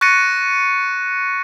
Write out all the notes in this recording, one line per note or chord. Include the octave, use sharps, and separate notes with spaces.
C#6 F#6 A6 A#6 C#7 D#7